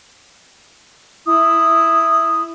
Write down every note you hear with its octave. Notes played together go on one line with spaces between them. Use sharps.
E4 D#6